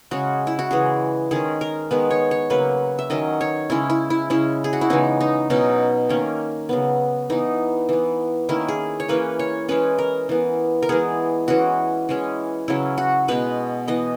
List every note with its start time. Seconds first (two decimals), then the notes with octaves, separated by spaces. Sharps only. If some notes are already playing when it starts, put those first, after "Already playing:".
0.11 C#3 G#3 C#4 F#4
0.47 E4
0.59 F#4
0.71 C#3 E3 G#3 G#4
1.31 D#3 G#3 C#4 G#4
1.61 A#4
1.91 D#3 G#3 B3 B4
2.10 C#5
2.31 C#5
2.50 C#3 F#3 A#3 B4
2.99 E5
3.10 D#3 F#3 C#4 D#5
3.41 C#5
3.70 C#3 G#3 C#4 E4
3.90 E4
4.10 E4
4.30 C#3 G#3 C#4 E4
4.64 G#4
4.73 F#4
4.81 E4
4.90 C#3 E3 G#3 B3 D#4
5.20 D#4
5.50 B2 F#3 C#4 D#4
6.09 D#3 A#3 C#4
6.69 C#3 F#3 B3
7.30 E3 B3 D#4
7.89 E3 B3
8.49 D#3 A#3 C#4 E4
8.68 G#4
9.00 C#5
9.08 E3 A#3 C#4 B4
9.39 C#5
9.68 E3 G#3 C#4 B4
9.98 A#4
10.29 E3 B3
10.83 A#4
10.89 E3 G#3 B3 G#4
11.48 E3 G#3 C#4 F#4
12.09 E3 G#3 C#4
12.68 C#3 F#3 C#4 E4
12.98 F#4
13.28 B2 G#3 B3 B4
13.88 E3 B3 D#5